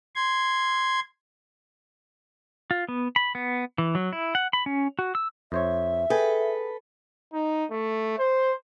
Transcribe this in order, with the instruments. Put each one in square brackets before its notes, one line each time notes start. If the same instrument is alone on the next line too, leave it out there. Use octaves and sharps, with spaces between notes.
[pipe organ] C6 G#6
[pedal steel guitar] F4
B3
B5
B3
E3
F#3
E4
F#5
B5
C#4
F#4
E6
[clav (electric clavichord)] F2 C5 C#5 [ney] E5
[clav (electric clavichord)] G#4 G5 G#5 [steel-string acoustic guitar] A4 B4
[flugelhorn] D#4
A3
C5